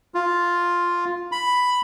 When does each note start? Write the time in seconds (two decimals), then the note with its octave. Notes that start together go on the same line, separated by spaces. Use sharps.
0.14 F4
1.32 B5